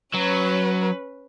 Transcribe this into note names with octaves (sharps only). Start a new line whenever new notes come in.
F#3 C#4 B4